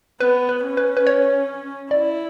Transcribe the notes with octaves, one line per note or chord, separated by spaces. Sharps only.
B3 B4
B4
C#4
B4
B4
C#5
E4 D5